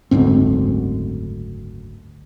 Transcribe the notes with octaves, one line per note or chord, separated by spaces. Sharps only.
F#1 D2 G#2 C4